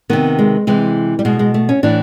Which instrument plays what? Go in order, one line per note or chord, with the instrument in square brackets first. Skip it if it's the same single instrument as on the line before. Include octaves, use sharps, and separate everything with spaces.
[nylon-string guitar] C3 D#3 B3
G#3
C3 E3 G#3
G3
B2 G#3
G#3
A3
C#4
A2 E3 D4